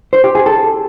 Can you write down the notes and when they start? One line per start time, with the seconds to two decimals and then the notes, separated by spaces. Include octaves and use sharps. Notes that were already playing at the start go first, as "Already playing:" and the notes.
0.13 C5
0.24 G4
0.35 G#4
0.46 A4